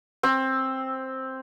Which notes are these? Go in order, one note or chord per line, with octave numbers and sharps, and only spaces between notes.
C4